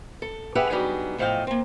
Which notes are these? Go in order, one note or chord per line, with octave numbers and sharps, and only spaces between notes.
A4
G4 G#4 B4 E5 F#5
F#3 G3 B3 D4 D#4 G#4
E2 A2 F3 D#5 F5 G5
A#3 C4